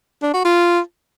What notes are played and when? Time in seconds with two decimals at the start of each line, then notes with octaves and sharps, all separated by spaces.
0.23 D4
0.34 F#4
0.45 F4